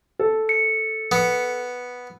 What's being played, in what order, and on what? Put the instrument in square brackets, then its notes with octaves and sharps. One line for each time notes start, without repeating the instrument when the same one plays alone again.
[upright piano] A4
[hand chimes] C#7
[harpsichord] B3